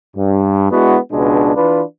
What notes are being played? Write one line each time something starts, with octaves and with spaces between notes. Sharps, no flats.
G2
G#3 B3 D4 E4 F#4
C#2 B2 G#3 D4
E3 D4 F4 B4